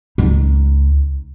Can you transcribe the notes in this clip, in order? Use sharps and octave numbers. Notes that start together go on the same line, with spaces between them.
C#2 D#4